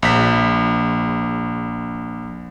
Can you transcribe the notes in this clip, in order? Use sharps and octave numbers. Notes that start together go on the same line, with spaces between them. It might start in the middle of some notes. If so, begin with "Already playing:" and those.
A#1 B6